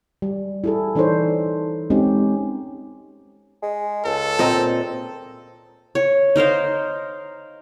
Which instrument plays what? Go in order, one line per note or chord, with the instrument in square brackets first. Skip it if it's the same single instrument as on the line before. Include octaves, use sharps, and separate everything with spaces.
[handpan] G3
E4 G#4 A4
E3 D4 D#4 A4 C5 C#5
G#3 C4 C#4 D#4 G4
[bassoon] G#3
[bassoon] C#2 [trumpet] A4
[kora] A#2 D#5 [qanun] C4 A#5
[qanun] C#5
D#4 A#4 C5 F5